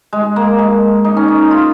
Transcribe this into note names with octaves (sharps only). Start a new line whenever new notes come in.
G#3
A#3
G#3
D#4
C#4
D#4
F4